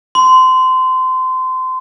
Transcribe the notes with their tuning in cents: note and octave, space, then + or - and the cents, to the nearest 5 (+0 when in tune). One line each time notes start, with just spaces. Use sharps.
C6 -25